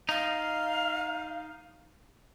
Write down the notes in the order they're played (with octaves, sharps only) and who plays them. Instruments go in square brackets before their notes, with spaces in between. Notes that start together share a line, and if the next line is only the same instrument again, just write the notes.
[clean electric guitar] D#4 [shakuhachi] F5